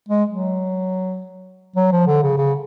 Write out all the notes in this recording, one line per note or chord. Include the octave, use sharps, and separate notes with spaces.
G#3
F#3
F#3
F3
D3
C#3
C#3